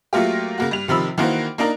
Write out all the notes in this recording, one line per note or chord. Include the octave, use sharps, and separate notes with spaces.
F#3 A3 A#3 F4 G4
C#3 A#3 F#4
G2 F7
C3 D#3 F3 B5 E6
D#3 E3 A#3 F#4 C5
A#3 D4 D#4 A#4